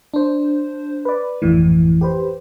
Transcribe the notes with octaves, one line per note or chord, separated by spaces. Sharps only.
D4 C5
B4 D5
G#1 F2 A2 E3
G4 B4 C5